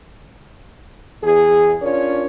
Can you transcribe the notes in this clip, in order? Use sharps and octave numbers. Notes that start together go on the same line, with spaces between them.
E2 G#4
C#4 D4 F4 A#4 C#5 D5